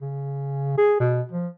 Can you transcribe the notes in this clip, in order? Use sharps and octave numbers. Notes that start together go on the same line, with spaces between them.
C#3
G#4
B2
F3